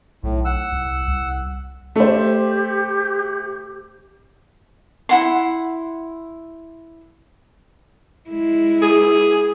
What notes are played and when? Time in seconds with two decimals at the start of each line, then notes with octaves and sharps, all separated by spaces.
0.23 B1 A2
0.45 F#5 E6
0.72 C2
1.08 C2
1.96 A3 G4 C5
5.09 E4 F#5 C6
8.30 G#3 E4
8.82 G#4